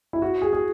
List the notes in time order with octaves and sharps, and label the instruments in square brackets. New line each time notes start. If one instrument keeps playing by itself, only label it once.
[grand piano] E4
F#4
G#4
G#4